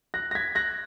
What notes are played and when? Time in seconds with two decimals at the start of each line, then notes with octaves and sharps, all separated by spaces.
0.14 F#6 A#6
0.31 A#6
0.35 G#6 B6
0.55 F#6 A#6